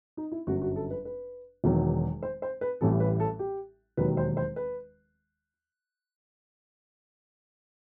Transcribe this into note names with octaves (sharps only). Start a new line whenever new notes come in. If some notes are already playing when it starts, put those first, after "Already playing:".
D#4
E4
G1 F#2 F#3 F#4
F#4
A4
B4
B4
E1 E2 D#3 F#3
C5
C5
B4
A1 A2 E3 G3 A4
B4
A4
G4
E1 D#2 D#3 F#3 B4
C5
C5
B4